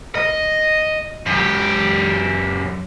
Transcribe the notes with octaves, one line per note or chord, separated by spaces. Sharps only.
D#5
F#2 G4